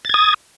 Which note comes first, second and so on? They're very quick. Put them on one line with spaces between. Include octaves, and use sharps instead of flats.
A6 G#6 D#6